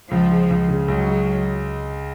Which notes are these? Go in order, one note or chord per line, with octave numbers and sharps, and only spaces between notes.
C#2 F3
G#3
C#2
C#3
C#2 F#3
G#3